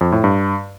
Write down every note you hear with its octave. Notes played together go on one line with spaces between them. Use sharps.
F2
A2
G2